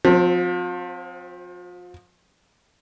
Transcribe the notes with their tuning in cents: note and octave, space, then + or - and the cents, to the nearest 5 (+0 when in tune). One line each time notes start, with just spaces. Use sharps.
F3 +35 C4 +0